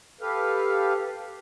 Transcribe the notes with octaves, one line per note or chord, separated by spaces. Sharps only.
G4 A4 B4 F5